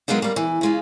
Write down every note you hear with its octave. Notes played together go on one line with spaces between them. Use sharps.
F#3 G#3 A#3 B3 D#4
G3 A#3
E3
C#3 G#3 F4